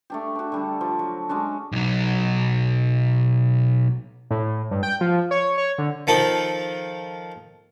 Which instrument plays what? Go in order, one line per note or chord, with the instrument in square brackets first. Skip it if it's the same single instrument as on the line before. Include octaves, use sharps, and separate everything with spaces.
[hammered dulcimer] A3 D4 G4
D4 F#4
D3 G3 A4
F3
F#3
G#3 C#4 D4 F#4
[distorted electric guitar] B1 F#3
[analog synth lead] A2
G2
G5
F3
C#5
C#5
D3
[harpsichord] D#3 F3 A4